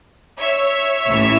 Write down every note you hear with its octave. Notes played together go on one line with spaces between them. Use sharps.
C#5 E5
A1 A2 E3